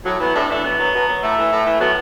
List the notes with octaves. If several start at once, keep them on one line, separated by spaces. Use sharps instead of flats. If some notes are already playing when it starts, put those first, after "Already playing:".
A2 F#3
E3 F#3 B3
A2 A3 D4
E3 A3 D4
B2 F#3 B3
F#3
B2
F#3
A2 A3
E3
A2
E3
A2 F#3 B3